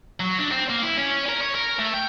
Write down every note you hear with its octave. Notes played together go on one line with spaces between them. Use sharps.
F#3
D4
C4
A#3
E4
C#4
A#4
C#5
A#4
A3
G5